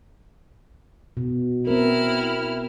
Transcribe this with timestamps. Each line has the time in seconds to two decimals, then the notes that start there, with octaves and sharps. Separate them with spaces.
1.17 B2
1.67 B3 C4 E4 A#4 F6